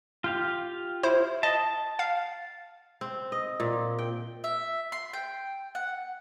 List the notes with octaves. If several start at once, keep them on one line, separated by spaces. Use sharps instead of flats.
F4 G4 F5
E4 C5
D#5 A5
F5
C4
D#5
A#2
G5
E5
C6
G5
F#5